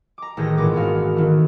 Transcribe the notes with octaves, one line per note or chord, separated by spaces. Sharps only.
A#5 D6
A1 D#3 G#4 G6 A#6
G#1 A#2 E3 C#4 D6 A#6
B3 C4 F#4 F5
D#3 E3 A3